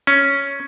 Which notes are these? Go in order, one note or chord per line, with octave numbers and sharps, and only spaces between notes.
C#4